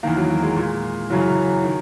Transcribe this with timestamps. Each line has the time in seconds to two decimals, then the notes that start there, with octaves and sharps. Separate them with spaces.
0.03 E2 D#3 A#3
0.16 F#3
0.30 F#3
0.43 G#3
0.56 A#2
1.10 F#2 C#3 E3 F#3
1.63 D#3